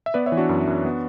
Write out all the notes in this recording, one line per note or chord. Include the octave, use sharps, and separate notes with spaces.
E5
B3 B4 D5
C#5 E5
E3
D4 F#4
F#2
F#2
B3